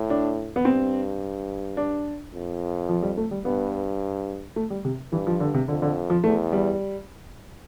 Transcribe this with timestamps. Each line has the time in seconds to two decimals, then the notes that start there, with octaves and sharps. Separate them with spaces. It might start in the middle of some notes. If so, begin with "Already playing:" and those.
Already playing: A2
0.10 D4
0.56 B3
0.65 G2 C4
1.77 D4
2.33 F2
2.89 F3
3.03 G3
3.18 A3
3.31 G3
3.45 G2 B3
4.56 A3
4.70 G3
4.85 C3
5.12 G2 E3
5.27 F3
5.40 D3
5.54 C3
5.68 F2 D3
5.82 D3
6.10 F3
6.24 E2 A3
6.52 G3